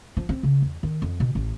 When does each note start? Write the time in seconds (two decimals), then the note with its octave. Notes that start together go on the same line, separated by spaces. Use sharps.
0.17 F3
0.29 C4
0.43 C#3
0.62 E2
0.83 D#3
1.02 F2
1.20 B2
1.35 A1